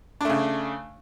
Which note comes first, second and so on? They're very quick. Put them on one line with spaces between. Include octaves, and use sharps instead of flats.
D4 A3 C#3